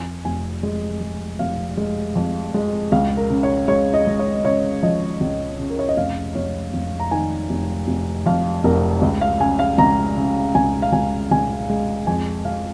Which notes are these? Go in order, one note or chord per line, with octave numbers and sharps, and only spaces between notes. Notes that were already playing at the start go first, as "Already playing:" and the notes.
Already playing: F2 G#5
F1 G#5
G#3
G#3
F1 F5
G#3
F2
G#3
C#2 F5
A#4
C#3
C#5
G#3 C#5
D#5
G#3
C#5
C#3 C#5
F3 D#5
C#2
C#3
A#4
C#5
D#5
F1 F5
F1 C#5
F1
A#5
D#3 G#5
F1
F1
F2 F5
F1 A#4
C#2
F5
C#3 G#5
F5
C#2 A#5
C#3
C#2 G#5
F5
C#2 G#5
C#2 G#5
G#3
F2 G#5
G#3 F5